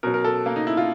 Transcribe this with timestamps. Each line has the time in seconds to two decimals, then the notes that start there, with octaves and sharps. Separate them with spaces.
0.03 B2 F#3 A#4
0.14 A#4
0.24 A4
0.46 A#3
0.56 D#4
0.67 E4
0.77 F4